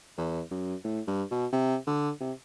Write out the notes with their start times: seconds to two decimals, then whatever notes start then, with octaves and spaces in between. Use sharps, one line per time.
0.18 E2
0.51 F#2
0.85 A2
1.08 G2
1.31 B2
1.53 C3
1.87 D3
2.20 C3